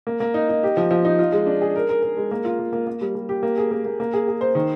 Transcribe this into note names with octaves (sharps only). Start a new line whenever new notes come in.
A#3
A#3
D#4
D#4
G4
F3
F3
D#4
F4
G#3
D4
G#4
A#4
A#4
A#4
G#3
A#3
F4
A#3
A#3
A#3
G3
G3
G4
A#3
G#4
A#3
A#3
A#3
G#4
G#4
C5
D#3